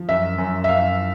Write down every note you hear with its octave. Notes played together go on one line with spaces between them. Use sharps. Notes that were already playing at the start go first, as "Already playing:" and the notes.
Already playing: F3
F#2 E5
F#2
E5
F#2 F5